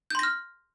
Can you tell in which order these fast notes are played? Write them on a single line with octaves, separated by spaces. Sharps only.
G6 C6 A#6 F6